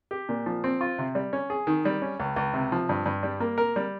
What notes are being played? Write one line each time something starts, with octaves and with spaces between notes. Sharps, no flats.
G4
A#2
F3
C4
F4
C3
G3
C#4
G#4
D#3
G3
C#4
C#2
C#2
C3
F3
G2
G2
G3
A#3
A#4
G3